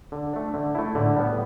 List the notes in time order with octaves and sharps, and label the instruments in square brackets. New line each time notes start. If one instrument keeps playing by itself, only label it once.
[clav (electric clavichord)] D3
A3 D4
D3
A3 E4
[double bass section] A2 [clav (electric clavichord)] D3
[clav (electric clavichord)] G3 B3